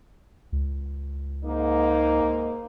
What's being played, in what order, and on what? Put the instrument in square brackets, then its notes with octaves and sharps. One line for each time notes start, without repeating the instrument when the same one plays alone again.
[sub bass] C#2
[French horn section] G#2 A#3 D#4